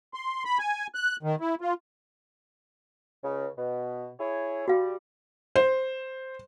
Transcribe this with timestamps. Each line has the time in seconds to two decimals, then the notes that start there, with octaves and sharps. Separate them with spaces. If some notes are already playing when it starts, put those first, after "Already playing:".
0.14 C6
0.45 B5
0.59 G#5
0.95 F#6
1.23 D#3
1.41 E4
1.61 F4
3.23 C#2 C#3
3.57 B2
4.19 E4 G#4 C#5
4.68 G3 F#4 F5
5.56 C5